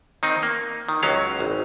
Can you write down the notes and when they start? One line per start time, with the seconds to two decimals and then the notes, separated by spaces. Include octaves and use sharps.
0.23 D#3 C4 D#4
0.43 A#3
0.89 D#3
1.03 C#2 F#3 C#4 F5
1.40 G#1